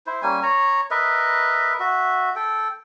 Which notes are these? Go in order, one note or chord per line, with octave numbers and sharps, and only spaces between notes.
E4 C5
G3 A#3 C#4 G#5
C#5 A#5
A#4 B4 D#5 E5
F#4 E5
A4 G5